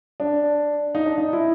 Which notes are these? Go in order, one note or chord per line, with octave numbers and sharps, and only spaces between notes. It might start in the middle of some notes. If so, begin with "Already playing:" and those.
D4
D#4
D4
D#4
E4